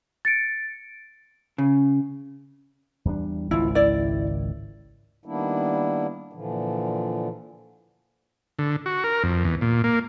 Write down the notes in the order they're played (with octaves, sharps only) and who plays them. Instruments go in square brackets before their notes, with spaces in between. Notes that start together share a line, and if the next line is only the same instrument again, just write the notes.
[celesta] A6 C#7 D7
[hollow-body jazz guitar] C#3
[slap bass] E2 G3 D4
[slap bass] G#1 C#2 D#3 [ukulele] E4 F4
[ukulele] E4 D5
[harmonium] D#3 G3 A#3 B3 D4 E4
A#2 D3 E3 F3
[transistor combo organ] D3
F#4
A#4
F2
E2
A#2
A#3